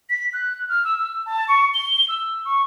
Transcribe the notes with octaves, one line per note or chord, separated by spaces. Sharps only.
B6
F#6
F6
E6
E6
A5
C#6
G7
E6
C#6